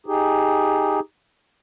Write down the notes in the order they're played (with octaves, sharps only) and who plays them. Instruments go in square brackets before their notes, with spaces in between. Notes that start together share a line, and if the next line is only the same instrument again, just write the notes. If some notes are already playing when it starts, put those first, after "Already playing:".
[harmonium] D#4 G4 G#4